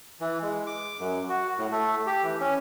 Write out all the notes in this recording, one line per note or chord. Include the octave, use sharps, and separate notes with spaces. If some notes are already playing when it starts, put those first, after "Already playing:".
E3
G#3
D6
F#2
F#4
A2
A3
G4
E3
C#4